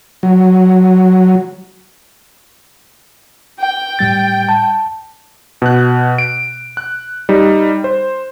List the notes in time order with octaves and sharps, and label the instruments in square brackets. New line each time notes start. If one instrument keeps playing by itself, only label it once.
[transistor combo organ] F#3
[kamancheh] G5
[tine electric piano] A2 G3 A6
A5
[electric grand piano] B2 F#6
D7
F#6
G3 D#4
C5